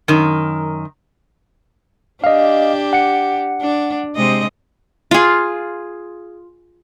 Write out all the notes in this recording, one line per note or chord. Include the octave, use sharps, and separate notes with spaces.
F#2 D#3
D4 G4 D#5 F5
F#5 C#7
D4
C3 G#3 D#5
F4 G#4